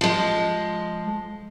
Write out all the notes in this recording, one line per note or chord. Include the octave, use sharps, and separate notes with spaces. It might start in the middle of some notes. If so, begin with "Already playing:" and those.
F3 G#3